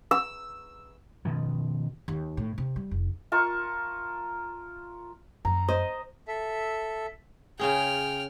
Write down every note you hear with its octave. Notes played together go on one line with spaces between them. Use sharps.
E6
B2 D#3 F3
D#2
A2
C3
G3
F1
F4 A#4 A5 C#6
F#2 A#5
C5 D#5
A4 E5
C#3 C#4 G#4 G5 F6